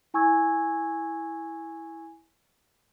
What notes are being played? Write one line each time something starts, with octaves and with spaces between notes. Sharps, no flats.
E4 G#5 C#6 E6 G#6